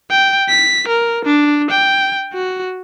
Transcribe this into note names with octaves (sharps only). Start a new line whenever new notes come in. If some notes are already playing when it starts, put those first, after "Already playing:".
G5
B6
A#4
D4
G5
F#4